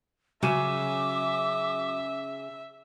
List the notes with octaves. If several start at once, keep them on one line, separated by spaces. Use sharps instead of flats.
C#3 F#3 E5 D6 D#7 E7